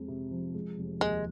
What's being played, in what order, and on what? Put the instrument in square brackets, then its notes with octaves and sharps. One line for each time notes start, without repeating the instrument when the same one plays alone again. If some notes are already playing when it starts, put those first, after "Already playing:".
Already playing: [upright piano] F2 G#3
C3
F3
G#3
F1
[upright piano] D#2 [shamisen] G#3